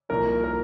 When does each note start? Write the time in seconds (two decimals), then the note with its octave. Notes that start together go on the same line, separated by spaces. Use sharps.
0.09 C2 A#2 F3 A#3 D#4 A#4
0.44 A#4